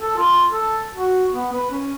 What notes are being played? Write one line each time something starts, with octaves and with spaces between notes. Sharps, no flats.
A4
F4
A4
F#4
B3
B4
C#4